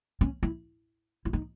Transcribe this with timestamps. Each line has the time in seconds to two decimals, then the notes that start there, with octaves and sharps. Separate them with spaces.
0.21 C#4
0.43 E4
1.25 E4
1.33 D#4